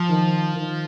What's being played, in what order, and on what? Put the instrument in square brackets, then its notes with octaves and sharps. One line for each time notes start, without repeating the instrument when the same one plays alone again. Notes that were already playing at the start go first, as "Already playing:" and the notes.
Already playing: [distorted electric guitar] F3
[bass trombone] D#3
D#3